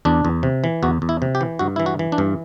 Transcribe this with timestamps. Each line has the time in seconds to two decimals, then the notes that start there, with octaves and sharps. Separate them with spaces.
0.05 E2 D4
0.25 E2
0.43 C3
0.64 E3
0.83 E2 F#4
1.02 E2
1.09 E4
1.22 C3
1.35 G4
1.41 E3
1.59 G2 F#4
1.76 E3 E4
1.86 F#4
1.99 E3
2.12 D4
2.18 G2